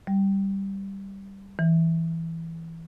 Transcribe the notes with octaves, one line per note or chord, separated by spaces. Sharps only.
G3
E3